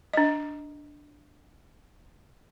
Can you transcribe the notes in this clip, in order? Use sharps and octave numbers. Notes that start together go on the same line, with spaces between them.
D4 D#5